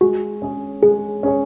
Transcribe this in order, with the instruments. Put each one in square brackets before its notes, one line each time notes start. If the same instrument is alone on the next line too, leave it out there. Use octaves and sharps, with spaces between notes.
[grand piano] G#3 [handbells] F#4
[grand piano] C#4 G#4 C#5
[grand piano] G#3 [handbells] G#4
[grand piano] C#4 G#4 C#5